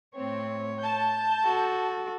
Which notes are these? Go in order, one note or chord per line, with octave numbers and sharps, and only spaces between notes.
A2 C4 C#5
A5 G6
F#4 A4